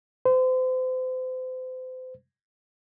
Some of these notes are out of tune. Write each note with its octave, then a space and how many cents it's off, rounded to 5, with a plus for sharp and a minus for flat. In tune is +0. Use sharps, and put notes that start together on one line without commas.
C5 -35